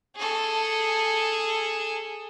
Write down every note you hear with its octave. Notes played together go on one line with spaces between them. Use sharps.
G#4 A4